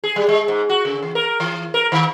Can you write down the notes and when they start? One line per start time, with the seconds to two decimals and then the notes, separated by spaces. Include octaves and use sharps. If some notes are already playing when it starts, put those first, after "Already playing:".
0.04 G#4
0.16 G3
0.29 G#3
0.48 G#2
0.69 F#4
0.85 C#3
1.02 E3
1.15 A#4
1.40 E3
1.74 A#4
1.92 D#3